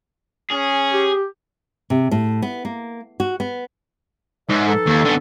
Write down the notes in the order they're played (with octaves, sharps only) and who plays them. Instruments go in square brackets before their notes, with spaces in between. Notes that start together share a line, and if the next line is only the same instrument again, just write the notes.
[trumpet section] C#4 [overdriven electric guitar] G#4
[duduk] G4
[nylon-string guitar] C3
A2
B3
A#3
F#4
B3
[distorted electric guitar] G#2 [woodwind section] A#4 D5 E5
[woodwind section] E3 D#4 A4
[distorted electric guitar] D#2
D3 B3